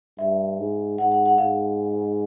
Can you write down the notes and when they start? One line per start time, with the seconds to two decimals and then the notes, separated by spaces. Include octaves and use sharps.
0.18 G2 E5
0.59 G#2
0.98 G#2 F#5
1.12 F#5
1.26 F#5
1.38 G#2 F5